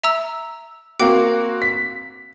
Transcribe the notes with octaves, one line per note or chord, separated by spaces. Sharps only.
E5 A#5 E6
A#3 C4 F#4 G5 D6
B6